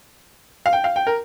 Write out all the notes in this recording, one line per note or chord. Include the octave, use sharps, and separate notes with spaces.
F5
G5
F5
G5
A#4